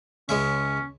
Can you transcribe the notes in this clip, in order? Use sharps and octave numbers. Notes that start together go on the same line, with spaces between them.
C#2 G#3 C#4 E5